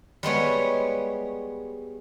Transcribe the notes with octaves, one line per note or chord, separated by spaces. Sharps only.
G3 G#3 B3 C#5